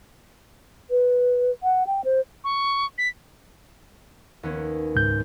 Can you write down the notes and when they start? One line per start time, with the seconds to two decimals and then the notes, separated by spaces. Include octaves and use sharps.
0.90 B4
1.63 F#5
1.87 G5
2.04 C5
2.44 C#6
2.98 B6
4.43 D#2 B3 C#4
4.95 C#2 G#2 G6